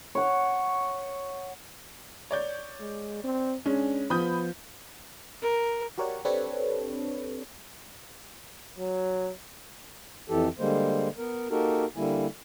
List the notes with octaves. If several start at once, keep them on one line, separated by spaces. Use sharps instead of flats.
C#5 F#5
C#5 D5 G6
G#3
C4
G#3 C#4 D4
F3 B3 B5 D#6 G6
A#4
F#4 G4 A#4 C#5 D5 F#5
C4 D4 G4 A4 B4 C#5
F#3
F2 E3 G4 A4
D3 G3 G#3 A#3 C5
B3 A#4
A#3 D#4 F#4 G4 A4 A#4
D3 G3 A#3 E4 G#5